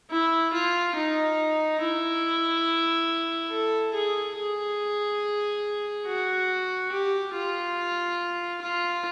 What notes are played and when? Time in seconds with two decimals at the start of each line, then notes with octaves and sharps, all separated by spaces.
0.11 E4
0.53 F4
0.96 D#4
1.81 E4
3.51 A4
3.94 G#4
4.37 G#4
6.06 F#4
6.92 G4
7.34 F4
8.62 F4